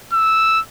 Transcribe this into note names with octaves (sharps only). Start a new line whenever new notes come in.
E6